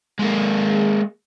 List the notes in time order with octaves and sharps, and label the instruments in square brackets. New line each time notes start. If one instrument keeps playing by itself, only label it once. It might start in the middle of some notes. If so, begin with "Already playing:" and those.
[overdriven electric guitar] G#3 A#3